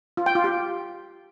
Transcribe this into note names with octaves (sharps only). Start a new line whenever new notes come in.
F4
G5
F4
G4